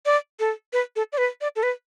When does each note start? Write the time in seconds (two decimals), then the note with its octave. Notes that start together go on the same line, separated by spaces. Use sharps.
0.06 D5
0.40 A4
0.73 B4
0.96 A4
1.13 D5
1.18 B4
1.41 D5
1.56 A4
1.63 B4